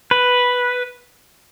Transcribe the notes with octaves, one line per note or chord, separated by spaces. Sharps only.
B4